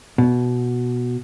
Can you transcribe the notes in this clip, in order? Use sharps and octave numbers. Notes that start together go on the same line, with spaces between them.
B2